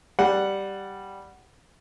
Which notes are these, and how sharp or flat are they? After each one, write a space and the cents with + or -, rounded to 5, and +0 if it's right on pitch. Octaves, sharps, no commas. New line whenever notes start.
G3 +0 F#5 +0